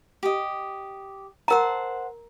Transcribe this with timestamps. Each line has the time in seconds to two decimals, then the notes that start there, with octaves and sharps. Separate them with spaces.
0.23 G4 D#5
1.48 A#4 C5 F#5 A5 A#5